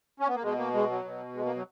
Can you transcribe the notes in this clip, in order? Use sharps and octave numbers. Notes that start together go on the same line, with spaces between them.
C#4
B3
A#3
B2 G#3
A#3
G#3
F#3
B2
G#3
A#3
F#3